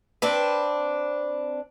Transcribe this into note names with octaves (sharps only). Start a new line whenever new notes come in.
C4 D4 B4